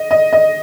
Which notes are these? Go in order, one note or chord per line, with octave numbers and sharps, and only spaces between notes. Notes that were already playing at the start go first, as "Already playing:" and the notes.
Already playing: D#5
D#5
D#5